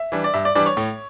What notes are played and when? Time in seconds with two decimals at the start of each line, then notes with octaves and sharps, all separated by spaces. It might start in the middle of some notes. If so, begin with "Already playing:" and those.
Already playing: E5
0.12 E3 G3 D4
0.24 D5
0.34 G2 E5
0.45 D5
0.55 E3 G3 D4 D5
0.66 C#5
0.77 A2